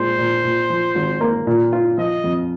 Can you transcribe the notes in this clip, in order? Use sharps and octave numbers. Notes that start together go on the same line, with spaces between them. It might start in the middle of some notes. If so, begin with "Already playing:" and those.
Already playing: A#2 G#3 C5
A#2
A#2
F3
G#1
A#3
A#2
F4
F3 D#5
F2